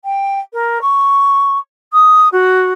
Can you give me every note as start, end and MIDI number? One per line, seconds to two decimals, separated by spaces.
0.04 0.39 79
0.53 0.78 70
0.81 1.58 85
1.92 2.28 87
2.32 2.73 66